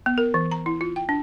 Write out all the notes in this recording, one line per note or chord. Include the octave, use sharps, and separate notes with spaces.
B3
A#4
E3
A#5
E4
F4
G5
D4